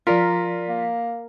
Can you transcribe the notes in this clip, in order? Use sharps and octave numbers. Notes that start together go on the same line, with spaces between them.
F3 F4 A#4 D5 B6
A#3